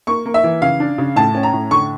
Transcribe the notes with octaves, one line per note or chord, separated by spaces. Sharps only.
A#3 C#6
A#3
E5
E3
C#3 F5
D4
C#3
A2 A5
C#4
A#5
A2
D3 C#6